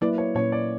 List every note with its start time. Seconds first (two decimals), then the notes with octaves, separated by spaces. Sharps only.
0.01 F#3 A#3 E4 B4 D5
0.18 C#5
0.35 A#2 A#3 C#4 C#5
0.52 D5